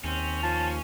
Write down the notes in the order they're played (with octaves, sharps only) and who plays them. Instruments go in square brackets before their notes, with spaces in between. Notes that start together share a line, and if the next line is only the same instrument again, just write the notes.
[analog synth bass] D#2 [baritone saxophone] C4 [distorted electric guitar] C#4
[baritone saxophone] F3 [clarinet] A5